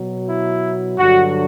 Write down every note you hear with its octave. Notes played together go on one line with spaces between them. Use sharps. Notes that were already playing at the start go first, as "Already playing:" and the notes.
Already playing: B2 F#3
E4
G2 D3 F#3 F#4